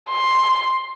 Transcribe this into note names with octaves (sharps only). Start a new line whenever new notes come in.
C6